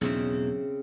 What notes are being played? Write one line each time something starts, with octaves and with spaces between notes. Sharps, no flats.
B1 E2 C#3 C4 E5